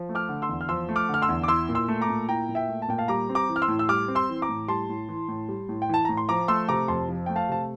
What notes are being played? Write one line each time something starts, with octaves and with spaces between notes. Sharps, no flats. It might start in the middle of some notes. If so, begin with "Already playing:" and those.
Already playing: F3
A3
D6 F6
D3
C6 E6
E2
F6
F3 C6 E6
A3
D6 F6
D3
F6
C6 E6
E2
D6
E4 C6 E6
A#2
C6 E6
A3
A#5 D6
A#2
E4 G5 A#5
A#2
E5 G5
A3
A5
A#2 G5
F5 A5
G3 A#5 D6
C4
A#5 D6
E3
F6
C6 E6
A2
E6
G3 D6 F6
C4
C6 E6
E3
A#5 D6
A2
G3 A5 C6
A2
E3
A2
G3
A2
G5
E3 A5
A2 A#5
C6
F3 A#5 D6
A3 C6 E6
C3 A#5 D6
F2 A5 C6
F3
A3 G5
F5 A5
C3 A5